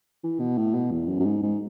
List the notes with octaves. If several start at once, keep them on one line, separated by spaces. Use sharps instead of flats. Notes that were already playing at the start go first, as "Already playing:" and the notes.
E3
B2
A2
B2
E2
F#2
F#2
G#2
G#2